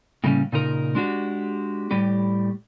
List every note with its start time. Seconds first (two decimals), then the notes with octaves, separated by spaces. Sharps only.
0.24 A2 C#3 G3 A#3 C#4
0.52 A#2 C#3 D#4 A#4
0.95 G#3 D4 F#4 G4
1.91 A2 G3 G4